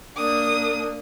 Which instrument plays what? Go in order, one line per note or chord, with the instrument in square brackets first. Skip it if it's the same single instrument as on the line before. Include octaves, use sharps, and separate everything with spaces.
[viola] A#3 D4 [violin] D#6